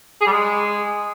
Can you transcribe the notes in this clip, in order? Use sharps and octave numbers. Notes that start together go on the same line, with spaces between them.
G#4
G3
G#3